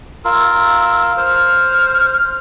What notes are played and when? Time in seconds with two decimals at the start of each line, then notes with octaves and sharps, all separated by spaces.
0.25 F4 A#4 E6
1.17 C5 F6